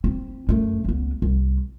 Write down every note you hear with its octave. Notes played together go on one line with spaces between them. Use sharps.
C4 E4
F#2 A3
C#2 B3
C2